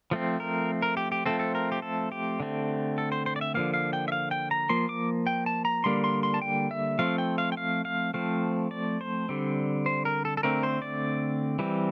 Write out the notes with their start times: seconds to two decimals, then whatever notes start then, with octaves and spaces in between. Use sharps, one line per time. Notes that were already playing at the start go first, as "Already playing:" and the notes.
0.11 F3 A3 C4
0.40 A#4
0.82 A#4
0.97 G4
1.12 G4
1.26 F3 A3 C4 A4
1.39 A4
1.55 A#4
1.72 G4
1.82 A4
2.12 G4
2.40 D3 A3 C4
2.98 A4
3.12 C5
3.26 C5
3.36 D5
3.41 E5
3.54 D3 F3 A#3 F5
3.74 F5
3.93 G5
4.08 E5
4.12 F5
4.31 G5
4.51 A#5
4.69 F3 A#3 C6
4.89 D6
5.27 G5
5.46 A5
5.65 A#5
5.84 D3 G3 A#3 C6
6.04 C6
6.23 C6
6.34 A5
6.42 G5
6.71 E5
6.99 F3 A3 C4 F5
7.18 G5
7.38 F5
7.52 G5
7.57 F5
7.85 F5
8.14 F3 A3 C4 F5
8.71 D5
9.01 C5
9.29 D3 G3 C4
9.86 C5
10.05 A#4
10.25 A4
10.37 A4
10.43 D3 A3 C4 A#4
10.63 C5
10.82 D5
11.59 E3 G3 C4